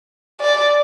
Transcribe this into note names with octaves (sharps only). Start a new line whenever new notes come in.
D5